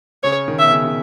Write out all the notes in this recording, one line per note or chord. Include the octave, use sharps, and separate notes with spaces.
C#3 C#5
D#3
B2 E5
C#3
C#3